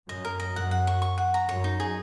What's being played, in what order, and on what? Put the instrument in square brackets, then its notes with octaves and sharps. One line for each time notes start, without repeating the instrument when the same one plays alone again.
[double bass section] F#2 [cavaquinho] D#5
[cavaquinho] A#4
D#5
[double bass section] F#2 [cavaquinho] F#5
[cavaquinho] F#5
C#6
C#6
F#5
A#5
[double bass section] F#2 [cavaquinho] C#5
[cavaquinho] D#4
G#4